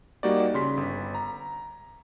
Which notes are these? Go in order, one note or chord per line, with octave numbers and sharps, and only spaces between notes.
G3 A#3 D#4 F#4 G4 D5
C#3 C6 B6
G1
A#5